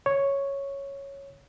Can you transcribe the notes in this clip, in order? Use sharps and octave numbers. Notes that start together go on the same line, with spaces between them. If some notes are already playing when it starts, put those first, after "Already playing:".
C#5